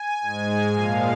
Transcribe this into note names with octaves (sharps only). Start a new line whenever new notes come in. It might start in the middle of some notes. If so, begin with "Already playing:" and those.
Already playing: G#5
G#2 G#3
A#2 F3 G#3 F5